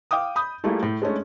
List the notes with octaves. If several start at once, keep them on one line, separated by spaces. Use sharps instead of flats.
F5 G5 D6 D#6
B5 D#6 G6
G3 A3 A#3 E4 F4 G#4
A2
G#3 A3 C#4 D4